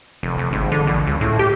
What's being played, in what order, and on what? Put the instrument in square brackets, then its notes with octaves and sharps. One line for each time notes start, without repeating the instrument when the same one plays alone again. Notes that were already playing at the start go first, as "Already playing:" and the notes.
[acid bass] F1
F1
G#1
D3
A#1
C#2
A2
G4